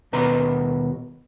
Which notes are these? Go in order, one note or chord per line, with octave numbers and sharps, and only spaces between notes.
D#2 B2 B4 A#5 C6